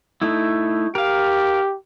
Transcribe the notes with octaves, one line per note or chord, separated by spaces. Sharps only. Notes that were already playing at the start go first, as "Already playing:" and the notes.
A3 D#4 E4
G4 A#4 F5